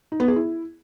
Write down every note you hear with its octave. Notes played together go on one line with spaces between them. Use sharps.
D#4
B3
G#4
E4